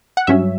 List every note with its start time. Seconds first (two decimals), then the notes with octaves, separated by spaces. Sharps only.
0.17 F#5
0.27 G2 F#3 C#4 E5